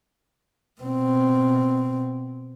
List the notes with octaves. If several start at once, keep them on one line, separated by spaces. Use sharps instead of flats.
B2 C4